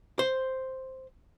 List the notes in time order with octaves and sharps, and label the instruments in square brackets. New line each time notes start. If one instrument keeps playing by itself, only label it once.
[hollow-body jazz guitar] C5